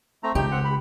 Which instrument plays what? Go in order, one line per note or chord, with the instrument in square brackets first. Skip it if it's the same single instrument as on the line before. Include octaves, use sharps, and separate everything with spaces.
[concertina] A3 C4 A#5
[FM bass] C#2 [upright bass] C#3 [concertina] D#4 [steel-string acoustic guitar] G4
[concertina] C4 F#5
B5